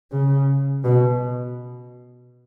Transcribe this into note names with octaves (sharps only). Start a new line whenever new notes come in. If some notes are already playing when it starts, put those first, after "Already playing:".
C#3
B2